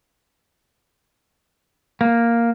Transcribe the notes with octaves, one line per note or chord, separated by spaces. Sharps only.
A#3